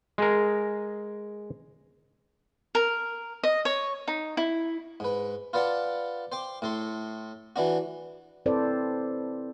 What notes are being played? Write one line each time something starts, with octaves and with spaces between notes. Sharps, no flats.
G#3 G#4 A#4
A#4
D#5
C#5
D#4
E4
G#2 B4
F4 B4 D5 F#5 A5
C5 G5 D6
A2 A4 C6
E3 D4 F#4
C4 E4 A4 B4 C5 D5